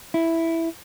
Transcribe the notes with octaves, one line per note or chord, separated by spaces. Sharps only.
E4